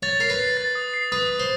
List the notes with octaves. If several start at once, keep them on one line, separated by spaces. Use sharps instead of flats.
C#5 A6
A#4 C7
B4
C7
A6
D#6
C7
B4 D#6
D#6
C5